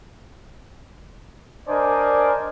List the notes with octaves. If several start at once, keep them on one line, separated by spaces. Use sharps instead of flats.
D4 A#4 C5 D5 D#5 G#5